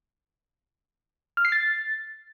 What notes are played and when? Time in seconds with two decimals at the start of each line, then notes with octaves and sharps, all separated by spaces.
1.37 F6
1.45 C7
1.52 A6